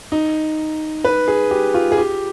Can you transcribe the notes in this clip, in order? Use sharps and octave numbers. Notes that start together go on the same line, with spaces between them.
D#4
B4
G#4
G4
F4
G#4
G4